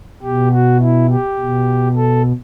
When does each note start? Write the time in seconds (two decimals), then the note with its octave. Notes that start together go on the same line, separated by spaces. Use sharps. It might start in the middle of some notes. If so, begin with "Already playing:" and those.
0.22 B2 G4
0.51 F#4
0.80 E4
1.10 G4
1.39 B2
1.96 A4